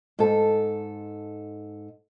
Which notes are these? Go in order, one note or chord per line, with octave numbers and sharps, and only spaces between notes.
G#2 A4